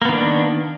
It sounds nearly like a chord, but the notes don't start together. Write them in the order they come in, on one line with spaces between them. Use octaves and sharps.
A#3 B3 D#3 D4